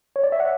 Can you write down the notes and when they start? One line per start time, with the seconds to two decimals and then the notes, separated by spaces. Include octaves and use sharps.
0.16 C#5
0.24 D5
0.32 E5
0.40 F#5